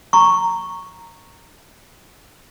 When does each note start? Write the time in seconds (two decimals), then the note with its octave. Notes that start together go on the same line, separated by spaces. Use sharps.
0.13 A#5 C#6